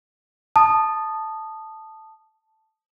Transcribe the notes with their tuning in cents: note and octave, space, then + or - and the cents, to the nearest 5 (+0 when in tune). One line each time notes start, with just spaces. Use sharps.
A5 +0 D#6 -15